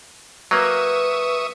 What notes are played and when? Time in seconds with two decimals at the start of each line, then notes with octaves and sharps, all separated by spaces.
0.51 F#3 A#3 B4 E5 C#6 D#6